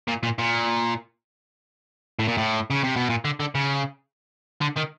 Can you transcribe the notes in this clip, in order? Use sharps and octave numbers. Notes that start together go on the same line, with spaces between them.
A#2
A#2
A#2
A2
A#2
A2
C#3
C3
B2
A#2
D3
D3
C#3
D3
D#3